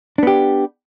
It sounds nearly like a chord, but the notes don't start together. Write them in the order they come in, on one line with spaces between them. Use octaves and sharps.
D4 B3 G4